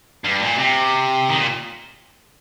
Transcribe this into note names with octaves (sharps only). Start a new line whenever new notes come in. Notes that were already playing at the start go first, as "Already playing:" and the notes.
G2
A#2
C3
D#3
A#2